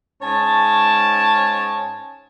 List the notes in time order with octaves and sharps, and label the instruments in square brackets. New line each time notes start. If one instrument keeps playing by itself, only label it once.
[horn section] G#2 C#4 C#5 A5